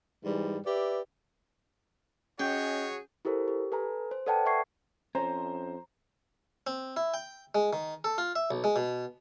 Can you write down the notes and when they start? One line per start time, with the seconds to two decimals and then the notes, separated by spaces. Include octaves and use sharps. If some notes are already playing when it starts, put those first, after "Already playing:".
0.25 G#2 E3 G3
0.66 G4 B4 D5 E5
2.40 C#4 F#4 G#4 C#5 D#5 G5
3.25 E4 G4 A4 A#4 C5
3.48 G4
3.72 A4 B4 G#5 A#5
4.11 C5
4.26 A4 B4 D5 F#5 G5 A5
4.46 D5 E5 F#5 C#6 G#6 C7
5.15 F2 C#4 C5 A#5
6.67 C4
6.97 E4
7.14 G5
7.55 G#3
7.73 D#3
8.04 A4
8.18 F4
8.36 E5
8.51 B1
8.64 G#3
8.76 B2